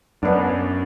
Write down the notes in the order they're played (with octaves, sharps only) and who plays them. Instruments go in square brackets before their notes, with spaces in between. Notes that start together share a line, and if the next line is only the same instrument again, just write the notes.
[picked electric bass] F#2 [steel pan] B3 D4